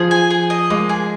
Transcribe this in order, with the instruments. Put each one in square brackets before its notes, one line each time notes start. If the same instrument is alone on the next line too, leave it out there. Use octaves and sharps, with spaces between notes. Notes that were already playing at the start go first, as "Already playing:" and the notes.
Already playing: [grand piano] F3 [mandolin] G#4
[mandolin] G#5
G#4
D#5
[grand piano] G#3 [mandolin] A#3
[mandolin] G#4